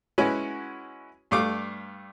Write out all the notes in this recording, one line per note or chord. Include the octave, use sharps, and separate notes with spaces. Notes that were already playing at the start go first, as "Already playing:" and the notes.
G#3 C#4 E4 F#4 B4 G#5
G2 A3 F5 D6